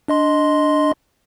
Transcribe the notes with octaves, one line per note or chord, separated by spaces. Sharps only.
D4 D#5 C6